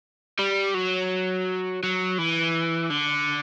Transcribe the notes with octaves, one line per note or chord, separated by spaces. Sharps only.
G3
F#3
F#3
E3
D3